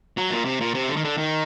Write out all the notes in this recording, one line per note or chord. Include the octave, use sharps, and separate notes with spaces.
F#3
A#2
C3
A#2
C3
D3
D#3
D3
D#3